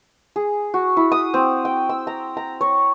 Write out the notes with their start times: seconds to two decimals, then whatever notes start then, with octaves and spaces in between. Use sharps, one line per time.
0.36 G#4
0.74 F#4
0.97 E4
1.12 D#6
1.34 C4
1.65 G5
1.89 E6
2.07 A#5
2.37 A#5
2.61 C#5